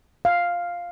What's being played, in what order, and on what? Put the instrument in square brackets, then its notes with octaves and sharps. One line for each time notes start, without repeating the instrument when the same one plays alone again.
[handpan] F5